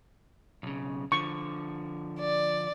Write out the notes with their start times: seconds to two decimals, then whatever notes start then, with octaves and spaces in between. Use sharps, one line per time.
0.63 B1 C#3
1.12 D3 F3 C#6
2.20 D5